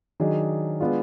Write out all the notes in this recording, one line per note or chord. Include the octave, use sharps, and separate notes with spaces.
D#3 F#3 D4 G#4 D#5
G#3 B3 D4 F4